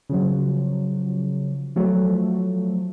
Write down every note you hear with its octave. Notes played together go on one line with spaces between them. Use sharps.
C#3 F3 F#3
F3 F#3 A3